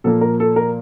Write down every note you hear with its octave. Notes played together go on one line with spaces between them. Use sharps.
A#2 F3 A#3 A4
A#4
A4
A#4